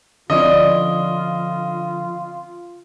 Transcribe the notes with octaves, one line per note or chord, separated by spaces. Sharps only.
D3 F3 C4 C#4 E4 F4 D5 D#5